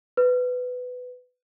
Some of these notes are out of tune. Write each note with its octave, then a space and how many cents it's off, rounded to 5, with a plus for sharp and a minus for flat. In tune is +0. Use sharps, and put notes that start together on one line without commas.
B4 +15